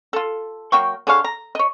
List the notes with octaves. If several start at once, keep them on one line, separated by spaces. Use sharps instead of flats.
F4 A4
F#3 A#3 G5 C#6
D3 G#4 C#5 F5
A#5
C#5 D#5